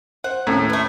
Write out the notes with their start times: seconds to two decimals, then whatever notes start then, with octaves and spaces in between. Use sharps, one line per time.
0.24 C5 F#5
0.47 D#2 A2 C#4 A#5
0.70 A3 B4